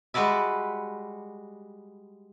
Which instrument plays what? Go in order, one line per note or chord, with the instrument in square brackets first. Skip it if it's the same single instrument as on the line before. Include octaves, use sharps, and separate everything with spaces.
[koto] G3 G#3 F#4 B4 D5 E5